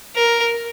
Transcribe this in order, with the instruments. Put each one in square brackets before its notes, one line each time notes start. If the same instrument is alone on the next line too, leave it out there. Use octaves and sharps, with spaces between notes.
[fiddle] A#4